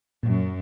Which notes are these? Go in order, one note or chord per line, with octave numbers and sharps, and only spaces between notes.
F#2 A#2